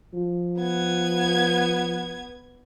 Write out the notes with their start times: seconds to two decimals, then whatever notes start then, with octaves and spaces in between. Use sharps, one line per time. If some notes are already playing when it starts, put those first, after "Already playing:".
0.14 F3
0.60 B3 G#6